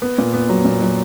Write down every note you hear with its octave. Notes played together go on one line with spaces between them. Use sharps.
B3
A#2
B3
F#3
A#2
F#3